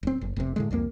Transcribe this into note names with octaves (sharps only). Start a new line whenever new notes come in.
D1 C4
F#1
F1 C3
A2 D3 G#3
C2 F2 F#3 A#3